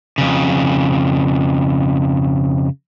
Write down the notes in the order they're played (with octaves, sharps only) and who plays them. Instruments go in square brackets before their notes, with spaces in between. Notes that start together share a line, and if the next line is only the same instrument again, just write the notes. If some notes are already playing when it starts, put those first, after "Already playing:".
[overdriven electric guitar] F2 C#3